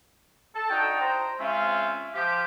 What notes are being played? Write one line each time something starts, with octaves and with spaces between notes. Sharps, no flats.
A4 A5
D4 D#4 F#4 G5
C5 A#5
G#3 C4 C#4 F4 E5 F5
F3 G4